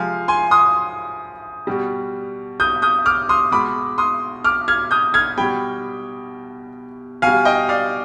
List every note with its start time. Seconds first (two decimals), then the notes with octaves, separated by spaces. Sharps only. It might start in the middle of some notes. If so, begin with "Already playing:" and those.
Already playing: C3 F3 G#3 F5 G#5
0.28 G#5 C6
0.51 C6 D#6
1.67 B2 G3
2.60 D#6 G6
2.82 D#6 G6
3.06 D6 F6
3.29 C6 D#6
3.52 B2 G#3 B5 D6
3.98 C6 D#6
4.44 D6 F6
4.68 F6 G#6
4.91 D#6 G6
5.14 F6 G#6
5.37 B2 G3 G5 B5
7.22 B2 G3 F5 G#5
7.45 D#5 G5
7.69 D5 F5